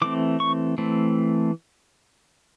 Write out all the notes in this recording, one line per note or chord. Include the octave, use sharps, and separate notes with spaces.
E3 A3 C4 D6
C#6
E3 A3 C4